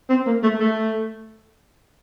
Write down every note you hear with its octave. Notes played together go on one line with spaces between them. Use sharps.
C4
A#3
A3
A3